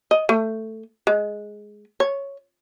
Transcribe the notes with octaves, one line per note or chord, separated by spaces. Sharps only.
D#5
A3
G#3
C#5